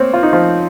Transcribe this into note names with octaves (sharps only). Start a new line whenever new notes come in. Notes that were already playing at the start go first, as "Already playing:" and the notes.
Already playing: A#3 C4 C5 C#5
F4
D#4
F3 F4